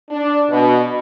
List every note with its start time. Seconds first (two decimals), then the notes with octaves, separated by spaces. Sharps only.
0.11 D4
0.51 B2